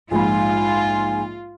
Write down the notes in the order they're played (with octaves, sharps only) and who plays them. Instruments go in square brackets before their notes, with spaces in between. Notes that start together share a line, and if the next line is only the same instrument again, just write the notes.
[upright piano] A#1 G#2 B5 [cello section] F4 [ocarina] G#5